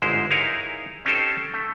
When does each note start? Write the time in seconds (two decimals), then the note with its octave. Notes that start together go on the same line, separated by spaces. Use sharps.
0.02 G1 G#2 G#3 E4 C5
0.30 D#4 E4 G#4 A#4 C#5 F5
1.05 C4 C#4 D#4 G4 A4 C5
1.54 A3